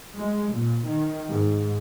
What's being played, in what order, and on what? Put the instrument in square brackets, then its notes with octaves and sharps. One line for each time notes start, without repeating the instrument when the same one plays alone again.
[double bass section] G#3
A#2
D#3
G#2